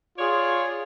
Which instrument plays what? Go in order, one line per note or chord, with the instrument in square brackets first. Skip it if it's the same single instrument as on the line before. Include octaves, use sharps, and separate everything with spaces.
[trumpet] F4 [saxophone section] G#4 C#5 D5